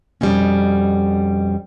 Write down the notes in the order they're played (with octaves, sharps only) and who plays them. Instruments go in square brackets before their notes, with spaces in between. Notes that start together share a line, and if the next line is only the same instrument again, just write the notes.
[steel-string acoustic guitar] F2 B2 G3 G#3 C4 C#4